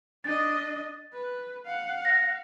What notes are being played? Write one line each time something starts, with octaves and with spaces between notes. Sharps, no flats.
D4 D#5 A6
B4
F5 F#5
A#6